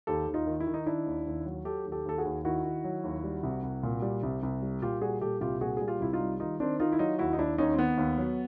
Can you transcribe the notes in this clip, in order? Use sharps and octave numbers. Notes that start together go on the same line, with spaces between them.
D#2 G4 A4
D#2
D#4 F4
D#3
E4
D#3
D#4
D#3 D4 E4
D#2
D#2
F#3
F#3 G4 A4
D#2
G4 A4
D#2 A4
F#4 G#4
D#2
D#3 E4 F#4
D#3
F#3
D#2
G3
C2
C2
A#2
G3
C2
C2
G3
A#2 F4 G4
G3 F#4 G#4
A#2 G4 A4
C2 F4 G4
A#2 F#4 G#4
G3 G#4
F4 G4
C2 E4
D#4 F4
G3
D#3 D#4 F4
D#3 C4 D4
D#3 D#4 F4
E4
F#3 D#4 F4
D#2 E4 F#4
D#4
D#2 D4 E4
D#2 C#4 D#4
C4
D#3 B3
D#2
F#3